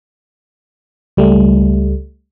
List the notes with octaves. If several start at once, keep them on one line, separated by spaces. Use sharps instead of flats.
C#2 G3 A3